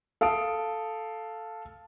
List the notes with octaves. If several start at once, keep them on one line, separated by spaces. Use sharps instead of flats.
A4 F5 D#6 D7